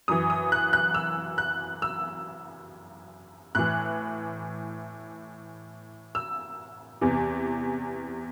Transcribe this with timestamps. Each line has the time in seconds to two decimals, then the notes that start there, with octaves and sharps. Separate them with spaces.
0.08 F#2 E3 D#6
0.30 D#6
0.52 F#6
0.73 F#6
0.94 E6
1.38 F#6
1.82 E6
3.55 A2 E3 F#6
6.15 E6
7.01 E2 C3 E3